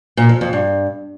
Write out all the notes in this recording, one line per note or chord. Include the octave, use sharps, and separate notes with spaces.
A#2
F2
F2
G2